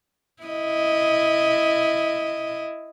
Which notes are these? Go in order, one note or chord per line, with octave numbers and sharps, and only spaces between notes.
E4 D#5